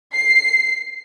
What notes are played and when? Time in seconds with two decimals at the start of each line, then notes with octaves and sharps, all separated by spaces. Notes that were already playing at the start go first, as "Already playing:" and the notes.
0.13 C7